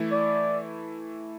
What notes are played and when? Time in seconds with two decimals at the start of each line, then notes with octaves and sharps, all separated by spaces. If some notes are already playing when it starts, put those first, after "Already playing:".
Already playing: E3 A3 E4
0.12 D5